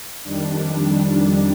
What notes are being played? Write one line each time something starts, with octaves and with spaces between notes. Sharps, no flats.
F2 D#3 G3 D4